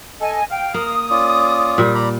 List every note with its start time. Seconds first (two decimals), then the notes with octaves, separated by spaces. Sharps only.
0.21 A4 D#5 G#5
0.50 F5 G5
0.74 A#3 D#6
1.10 C#4 F4 D5
1.78 A#2 G3
1.95 D5 A#5 B5